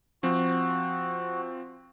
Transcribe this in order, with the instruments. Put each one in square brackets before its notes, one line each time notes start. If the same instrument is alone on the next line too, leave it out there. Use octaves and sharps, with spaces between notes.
[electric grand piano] F3 C4 [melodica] F#4